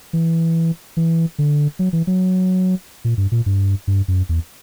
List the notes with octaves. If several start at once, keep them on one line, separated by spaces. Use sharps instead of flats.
E3
E3
D3
F#3
E3
F#3
A#2
G2
A#2
G2
G2
F#2
E2